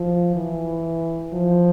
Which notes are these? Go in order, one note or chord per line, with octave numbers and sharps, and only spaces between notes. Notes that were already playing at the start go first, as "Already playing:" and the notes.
Already playing: F3
E3
F3